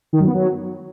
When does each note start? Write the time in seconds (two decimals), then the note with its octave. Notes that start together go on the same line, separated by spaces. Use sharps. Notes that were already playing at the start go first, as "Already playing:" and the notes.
0.13 D#3
0.20 F#2
0.27 B3
0.34 F#3